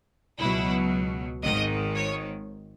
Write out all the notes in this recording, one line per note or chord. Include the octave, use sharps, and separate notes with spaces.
C#2 B2 F#3 E4
G#1 G#2 D#3 D#5
C#5